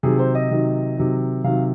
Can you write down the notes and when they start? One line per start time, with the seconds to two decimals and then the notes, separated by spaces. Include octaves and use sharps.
0.03 C3 D#3 F#3 G#4
0.19 C5
0.35 D#5
0.51 C3 D#3 F#3
0.97 C3 D#3 F#3
1.44 C3 D#3 F#3 F5